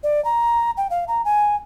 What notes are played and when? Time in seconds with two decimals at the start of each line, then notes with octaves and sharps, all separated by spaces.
0.03 D5
0.25 A#5
0.77 G5
0.90 F5
1.08 A#5
1.25 G#5